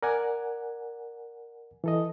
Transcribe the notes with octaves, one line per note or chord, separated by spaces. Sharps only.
A#4 D5 F#5 G#5
E3 A4 D#5